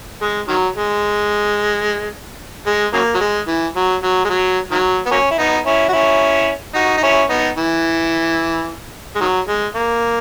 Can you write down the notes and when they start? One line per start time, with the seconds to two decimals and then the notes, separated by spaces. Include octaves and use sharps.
0.21 G#3
0.48 D#3 F#3
0.76 G#3
2.67 G#3
2.93 C#3 F#3 A#3
3.14 F#3
3.20 G#3
3.48 E3
3.76 F#3
4.03 F#3
4.25 G#3
4.29 F#3
4.71 D#3 F#3
5.06 B3
5.11 F#3 A#3 C#4
5.31 E4
5.38 B3 D#4
5.66 C#4 E4
5.89 F#4
5.93 C#4 E4
6.75 D#4 F#4
6.97 D#4
7.03 C#4 E4
7.30 B3 D#4
7.57 E3
9.15 G#3
9.20 D#3 F#3
9.48 G#3
9.75 A#3